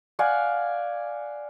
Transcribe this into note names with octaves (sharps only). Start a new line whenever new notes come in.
D5 F5 F#5 G#5